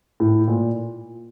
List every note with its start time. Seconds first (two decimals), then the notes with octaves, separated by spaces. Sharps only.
0.20 A2
0.48 A#2